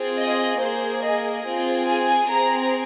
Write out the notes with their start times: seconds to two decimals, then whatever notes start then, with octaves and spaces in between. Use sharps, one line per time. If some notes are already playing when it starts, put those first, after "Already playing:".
Already playing: C4 F4 G#4
0.20 D#5
0.61 A#3 G#4 C5
1.03 D#5
1.45 C4 F4 G#4
1.86 G#5
2.28 C4 G#4 A#5